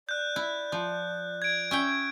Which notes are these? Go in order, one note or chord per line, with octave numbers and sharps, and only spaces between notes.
D5 F#6 G6
E4
F3
G#6 D7
C#4 E5 G5